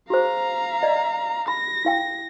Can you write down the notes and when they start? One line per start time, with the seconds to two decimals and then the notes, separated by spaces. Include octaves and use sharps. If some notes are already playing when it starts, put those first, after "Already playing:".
0.10 F#4 G#4 C5 F5 A#5
0.83 D5 D#5
1.48 B5 A#6
1.85 E4 F5 G5